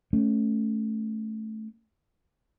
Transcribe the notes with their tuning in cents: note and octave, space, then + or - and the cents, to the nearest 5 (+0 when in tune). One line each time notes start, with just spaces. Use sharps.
A3 -10 C#4 +0